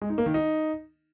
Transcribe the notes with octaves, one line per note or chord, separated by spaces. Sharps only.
G#3
D#4
A#3
D#3
D#4